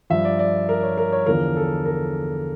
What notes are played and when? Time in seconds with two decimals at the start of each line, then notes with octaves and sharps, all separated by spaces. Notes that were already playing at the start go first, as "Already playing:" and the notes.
0.10 G2 F3 E5
0.25 D5
0.39 D5
0.69 A#4
0.83 C#5
0.98 A#4
1.12 C#5
1.26 E2 D3 F3 A#4
1.57 A4
1.85 A#4